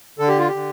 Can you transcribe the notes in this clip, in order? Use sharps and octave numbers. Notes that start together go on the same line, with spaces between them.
D3 A4
G4
F4
D3 G4